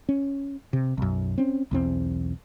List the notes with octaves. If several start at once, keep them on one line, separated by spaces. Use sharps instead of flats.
C#4
C3
B1 F#2
C4 C#4
B1 E2 C4